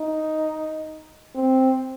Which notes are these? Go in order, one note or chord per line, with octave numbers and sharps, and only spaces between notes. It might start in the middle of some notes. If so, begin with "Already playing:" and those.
Already playing: D#4
C4